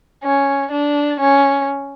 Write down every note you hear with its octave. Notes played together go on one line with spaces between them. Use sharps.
C#4
D4
C#4